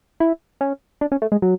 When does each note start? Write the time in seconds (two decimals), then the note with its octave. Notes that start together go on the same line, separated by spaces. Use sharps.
0.20 E4
0.61 C#4
1.01 D4
1.12 C#4
1.22 A3
1.32 G#3
1.42 F#3